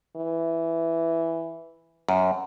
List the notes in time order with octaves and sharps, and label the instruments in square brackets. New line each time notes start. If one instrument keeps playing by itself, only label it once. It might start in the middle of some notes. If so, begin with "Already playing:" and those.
[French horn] E3
[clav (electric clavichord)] F#2